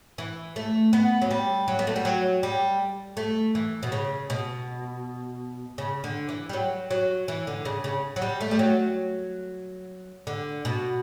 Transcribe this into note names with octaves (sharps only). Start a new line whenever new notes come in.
E3
A3
B3
F#3
G3
F#3
B3
A3
G3
F#3
G3
A3
E3
B2
C#3
B2
C#3
D3
E3
G3
F#3
F#3
E3
D3
C#3
C#3
F#3
G3
A3
G3
F#3
D3
B2